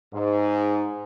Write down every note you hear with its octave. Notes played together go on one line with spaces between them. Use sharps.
G#2